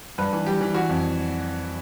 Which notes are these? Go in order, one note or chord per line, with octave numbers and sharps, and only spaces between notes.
G2 B4
E3
G3 G4
E3
E3 F#4
F2